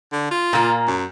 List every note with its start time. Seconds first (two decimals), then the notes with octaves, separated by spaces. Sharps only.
0.12 D3
0.31 F4
0.53 A#2 A#3
0.87 F#2